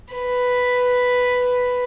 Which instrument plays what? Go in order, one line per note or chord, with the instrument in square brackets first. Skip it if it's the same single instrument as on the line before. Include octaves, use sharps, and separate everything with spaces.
[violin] B4